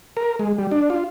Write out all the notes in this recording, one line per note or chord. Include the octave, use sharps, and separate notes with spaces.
A#4
G#3
G3
D4
F4